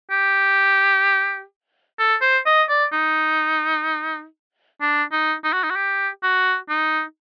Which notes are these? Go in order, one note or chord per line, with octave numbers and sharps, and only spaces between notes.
G4
A4
C5
D#5
D5
D#4
D4
D#4
D#4
F#4
D#4
F#4
G4
F#4
D#4